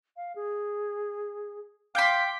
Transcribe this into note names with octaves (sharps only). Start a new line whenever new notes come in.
F5
G#4
F5 G5 C6 D6 G6 B6